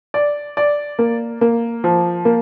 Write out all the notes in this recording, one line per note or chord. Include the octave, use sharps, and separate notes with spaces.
D5
D5
A#3
A#3
F3
A#3